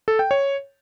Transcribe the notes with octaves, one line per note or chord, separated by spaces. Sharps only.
A4
G5
C#5